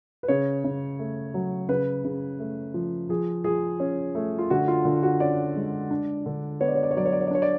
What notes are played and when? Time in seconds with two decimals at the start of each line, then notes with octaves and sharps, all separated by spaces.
0.23 B4
0.28 C#3 C#5
0.64 C#3
0.99 A3
1.34 F#3
1.69 C#3 B4
2.05 C#3
2.39 A3
2.74 F3
3.09 F3 G#4
3.44 F3 G#4
3.80 C#4
4.15 A3
4.39 F4
4.50 D3 F#4
4.68 F4
4.85 D3 F4
5.03 F#4
5.20 C#4 D5
5.56 G#3
5.91 D4
6.26 D3
6.61 B3 C#5
6.68 D5
6.75 C#5
6.83 D5
6.91 C#5
6.96 F#3 D5
7.06 C#5
7.13 D5
7.20 C#5
7.27 D5
7.31 D4 C#5
7.42 D5